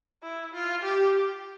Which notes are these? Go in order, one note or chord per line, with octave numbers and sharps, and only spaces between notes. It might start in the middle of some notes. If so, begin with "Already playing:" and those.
E4
F4
G4